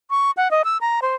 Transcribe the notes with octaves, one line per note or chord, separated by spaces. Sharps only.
C#6
F#5
D#5
E6
A#5
C5